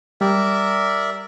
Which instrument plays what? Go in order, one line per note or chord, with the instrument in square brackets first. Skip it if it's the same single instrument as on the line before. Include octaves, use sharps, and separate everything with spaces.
[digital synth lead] G3 [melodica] A#4 D5 E5